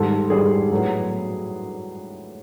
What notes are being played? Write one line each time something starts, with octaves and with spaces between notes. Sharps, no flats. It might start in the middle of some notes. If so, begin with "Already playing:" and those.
Already playing: G#2 D#3 G3 A4
G#2 D#3 G3 G#4
A2 F#3 B3